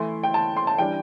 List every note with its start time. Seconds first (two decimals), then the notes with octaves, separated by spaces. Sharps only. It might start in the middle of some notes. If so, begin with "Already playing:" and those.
Already playing: E3 A3 E4 C6
0.23 G5
0.34 A5
0.57 C6
0.67 A5
0.78 E3 G3 D4 G5